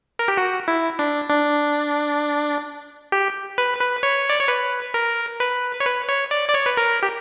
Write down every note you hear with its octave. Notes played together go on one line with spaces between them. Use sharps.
A#4
G4
F#4
E4
D4
D4
G4
B4
B4
C#5
D5
C#5
B4
A#4
B4
C#5
B4
C#5
D5
D5
C#5
B4
A#4
G4